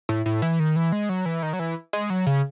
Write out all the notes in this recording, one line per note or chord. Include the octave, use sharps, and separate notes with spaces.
A2
A2
E3
D#3
E3
G#3
F#3
E3
D#3
F#3
E3
G#3
F#3
C#3